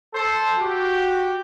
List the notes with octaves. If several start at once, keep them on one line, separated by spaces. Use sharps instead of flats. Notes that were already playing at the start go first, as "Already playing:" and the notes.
A4 C5
F#4 G4